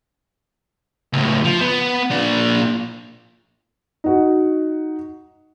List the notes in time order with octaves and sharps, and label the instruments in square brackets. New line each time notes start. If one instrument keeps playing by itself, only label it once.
[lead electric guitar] C#2 A2
F3
B3
A#2 D4
[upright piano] D#4 F#4